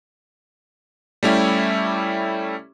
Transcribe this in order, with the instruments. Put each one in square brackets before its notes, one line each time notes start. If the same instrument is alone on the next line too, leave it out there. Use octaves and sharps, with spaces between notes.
[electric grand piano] G3 A3 C#4 E4 G4